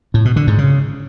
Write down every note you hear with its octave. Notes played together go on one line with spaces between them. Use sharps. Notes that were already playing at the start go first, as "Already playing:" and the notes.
A2
B2
D3
G#2
C#3